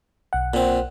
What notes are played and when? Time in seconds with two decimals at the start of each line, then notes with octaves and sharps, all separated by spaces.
0.33 B1 F#5
0.54 A#2 C4